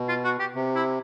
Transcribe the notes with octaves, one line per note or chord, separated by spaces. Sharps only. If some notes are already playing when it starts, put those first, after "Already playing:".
Already playing: B2
F4
F#4
G4
C3
E4